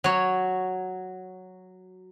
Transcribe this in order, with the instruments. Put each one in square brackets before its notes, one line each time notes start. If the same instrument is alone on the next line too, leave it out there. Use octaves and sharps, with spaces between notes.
[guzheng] F#3 C#5